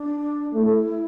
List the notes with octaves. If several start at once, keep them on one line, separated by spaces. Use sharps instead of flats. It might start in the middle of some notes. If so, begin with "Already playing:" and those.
Already playing: D4
A3 E4